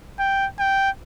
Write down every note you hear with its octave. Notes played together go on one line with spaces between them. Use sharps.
G5
G5